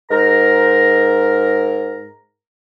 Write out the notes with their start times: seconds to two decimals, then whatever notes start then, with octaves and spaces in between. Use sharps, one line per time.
0.11 G#2 A#4 A#5